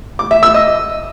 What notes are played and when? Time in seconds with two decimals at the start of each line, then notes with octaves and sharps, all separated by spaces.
0.19 D6
0.31 E5
0.43 E6
0.54 D#5